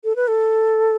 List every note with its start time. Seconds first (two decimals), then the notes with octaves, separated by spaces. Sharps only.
0.04 A4
0.16 B4
0.28 A4